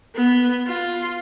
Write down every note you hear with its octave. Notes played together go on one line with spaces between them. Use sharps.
B3
F4